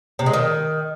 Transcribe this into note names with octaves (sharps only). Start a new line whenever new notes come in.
C3
G#3
D#3